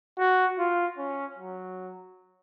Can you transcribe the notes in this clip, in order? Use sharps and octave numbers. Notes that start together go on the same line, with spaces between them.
F#4
F4
C#4
F#3